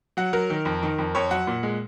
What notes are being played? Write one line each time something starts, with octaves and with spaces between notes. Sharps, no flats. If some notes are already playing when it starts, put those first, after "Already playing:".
F#3 F#5
F#3 A#4
D#3
F2
D#3
F2
F2 C#5
F#3 F#5
A#2
G#3